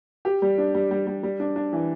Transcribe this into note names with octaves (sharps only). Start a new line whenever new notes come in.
G4
G3
D4
G3
G3
G3
G3
D4
D4
E3